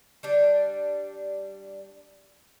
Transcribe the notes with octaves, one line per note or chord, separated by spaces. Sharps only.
G3 D4